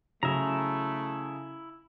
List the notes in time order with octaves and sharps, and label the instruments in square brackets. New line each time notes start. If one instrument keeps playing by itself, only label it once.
[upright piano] C#3 F#3 [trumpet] A3 [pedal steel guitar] E4 E5 A#5